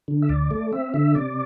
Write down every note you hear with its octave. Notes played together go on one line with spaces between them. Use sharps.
D3
E5
D2 D5
A3
C4 E5
D3 E5
C3 D5